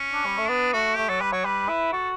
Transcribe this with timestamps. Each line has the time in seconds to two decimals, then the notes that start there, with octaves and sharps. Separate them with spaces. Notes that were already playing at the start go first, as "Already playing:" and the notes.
Already playing: C#4
0.13 D4
0.25 G3
0.38 A3
0.49 B3 D4
0.73 A3 F#4
0.97 A3 G4
1.09 F#3 A4
1.21 G3 B4
1.33 F#3 C#5
1.45 G3 B4
1.68 E4
1.93 F#4 A4